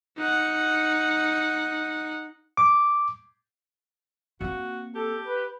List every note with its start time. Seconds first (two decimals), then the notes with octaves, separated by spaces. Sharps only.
0.17 D#4 F#5
2.57 D6
4.41 A#3 C4 F#4
4.95 G4 A4
5.27 B4